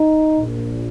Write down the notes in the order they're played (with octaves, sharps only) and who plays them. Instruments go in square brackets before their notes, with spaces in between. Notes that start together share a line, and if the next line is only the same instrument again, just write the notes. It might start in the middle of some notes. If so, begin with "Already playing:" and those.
Already playing: [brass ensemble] D#4
A#1 A#2